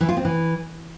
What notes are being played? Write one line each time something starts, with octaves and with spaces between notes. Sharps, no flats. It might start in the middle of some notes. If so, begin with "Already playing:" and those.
E3
F4
C4
E3